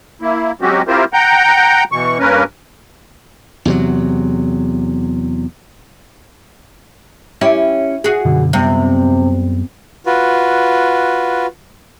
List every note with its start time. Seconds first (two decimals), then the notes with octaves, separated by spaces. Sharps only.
0.21 A#3 E4
0.61 F#3 G#3 C4 C#4 F#4 G4
0.88 C4 E4 F4 G4 A#4 C5
1.13 F#5 G5 A#5 G6
1.92 B2 E3 C#6
2.19 G2 A#3 C#4 A#4 B4
3.65 E2 C3 F#3
7.41 C#4 E4 G4
8.04 F#4 G#4
8.25 F#2 B2 D3
8.53 F#2 C3 G3 B3
10.06 F4 F#4 B4